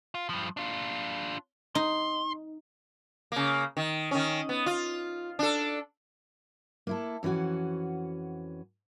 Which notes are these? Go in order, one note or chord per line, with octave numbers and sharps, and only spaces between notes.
F4
G2 F3
D4 F4
D#4 C6
C#3 A#3
D#3
D#3 C#4
B3
F4
D4 A4
A#3 E4 A4
F2 E3 C#4 F#4 F#5